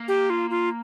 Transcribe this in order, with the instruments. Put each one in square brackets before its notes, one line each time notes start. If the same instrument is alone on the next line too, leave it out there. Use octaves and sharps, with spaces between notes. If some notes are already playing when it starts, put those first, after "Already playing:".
Already playing: [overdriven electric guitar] A#3
[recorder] G4
F4
F4